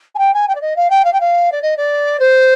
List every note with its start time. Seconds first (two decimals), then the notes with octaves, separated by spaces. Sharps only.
0.15 G#5
0.18 G5
0.34 G#5
0.48 G5
0.55 D5
0.61 D#5
0.76 F5
0.90 G5
1.04 F5
1.13 G5
1.20 F5
1.52 D5
1.62 D#5
1.77 D5
2.19 C5